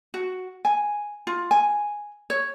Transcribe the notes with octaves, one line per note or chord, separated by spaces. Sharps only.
F#4
G#5
F4
G#5
C#5